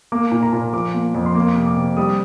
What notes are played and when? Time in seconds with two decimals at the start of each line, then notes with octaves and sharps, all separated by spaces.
0.12 A#3 D6
0.31 A#2
0.43 A#5
0.53 A#2
0.73 F3 D6
0.94 A#3
1.15 F2
1.26 C6
1.35 A#3 D6
1.56 C3
1.66 D6
1.77 C3
1.97 G3 D#6